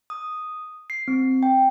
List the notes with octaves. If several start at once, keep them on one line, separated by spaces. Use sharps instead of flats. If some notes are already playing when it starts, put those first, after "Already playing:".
D#6
C7
C4
G5